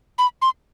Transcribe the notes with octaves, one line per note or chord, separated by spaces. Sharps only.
B5
C6